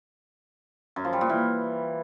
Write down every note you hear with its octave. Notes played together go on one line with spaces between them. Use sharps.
F#2
F3
G3
A#2
E3